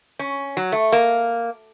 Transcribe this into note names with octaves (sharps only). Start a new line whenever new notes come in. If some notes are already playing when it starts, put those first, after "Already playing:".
C#4
F#3
A3
A#3